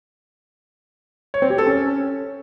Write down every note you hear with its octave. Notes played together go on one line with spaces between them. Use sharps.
C#5
C4
G4
A4
C#4